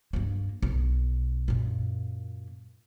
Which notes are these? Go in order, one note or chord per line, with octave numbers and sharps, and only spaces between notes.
G2 A#3
B1
F#2 A#2